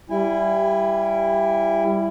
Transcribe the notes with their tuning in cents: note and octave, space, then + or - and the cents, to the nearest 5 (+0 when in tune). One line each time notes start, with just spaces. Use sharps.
G3 +0 E4 +15 G#5 -20